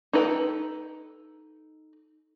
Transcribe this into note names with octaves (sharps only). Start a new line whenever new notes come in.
D#4 A4 B4 C5 G5